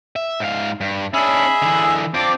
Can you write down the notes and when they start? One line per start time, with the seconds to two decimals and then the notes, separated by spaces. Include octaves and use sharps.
0.16 E5
0.40 G#2 F5
0.81 G2
1.14 C#4 D4 G#4 D#5 E5 B5
1.62 D3 E3
2.14 C4 D4 F4 D6